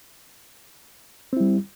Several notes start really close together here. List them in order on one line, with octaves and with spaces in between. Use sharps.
C4 E4 G3